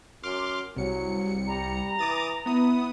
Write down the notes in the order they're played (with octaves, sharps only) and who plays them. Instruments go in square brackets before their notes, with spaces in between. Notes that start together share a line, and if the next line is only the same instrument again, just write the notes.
[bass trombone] F#2 [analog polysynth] C6 D6 F6
[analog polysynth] C2 C#7 [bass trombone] F#3
[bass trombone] G3 [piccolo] A#5
[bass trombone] E3 [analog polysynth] D6 D#6 A6
[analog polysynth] B3 D#6 [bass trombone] E4